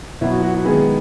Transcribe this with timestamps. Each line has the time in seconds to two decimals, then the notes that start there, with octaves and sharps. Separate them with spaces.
0.21 B2 F#3 B3 E4
0.32 F#4
0.43 F#4
0.55 F#4
0.65 D#3 G#3 B3 G#4